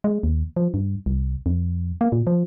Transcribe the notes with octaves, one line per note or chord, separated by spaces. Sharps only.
G#3
D#2
F3
G2
C2
F2
A#3
A#2
F3